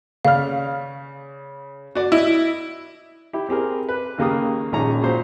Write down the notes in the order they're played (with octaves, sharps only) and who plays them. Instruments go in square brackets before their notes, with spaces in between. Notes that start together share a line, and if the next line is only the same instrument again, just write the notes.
[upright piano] C#3 D5 F6 [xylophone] F5
[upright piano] F#4 D5
[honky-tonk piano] E4 [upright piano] D#5
[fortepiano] E4 G4
C4 G4 G#4 A#4
B4
D#2 C#3 A#3 G4 A#4 D#6
A#1 D#3 G#3 C#4 A#5
A#2 F#4 C5